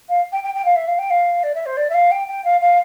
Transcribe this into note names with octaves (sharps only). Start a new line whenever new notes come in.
F5
G5
G5
G5
F5
E5
F5
G5
F5
D5
E5
C5
D5
E5
F5
G5
G5
F5
F5